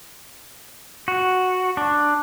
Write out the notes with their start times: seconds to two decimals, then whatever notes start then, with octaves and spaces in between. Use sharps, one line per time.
1.08 F#4
1.77 D4